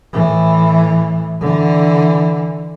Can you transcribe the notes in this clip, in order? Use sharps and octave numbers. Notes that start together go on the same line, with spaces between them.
A2 E3
D3 E3